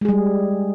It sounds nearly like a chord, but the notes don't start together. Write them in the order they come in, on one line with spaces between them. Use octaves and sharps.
G#3 G#4 G3